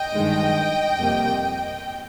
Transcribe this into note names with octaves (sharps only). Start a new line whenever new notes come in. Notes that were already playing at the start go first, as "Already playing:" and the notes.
Already playing: D#5 G5
G2 D#3 G#3
F2 C3 G3 A#3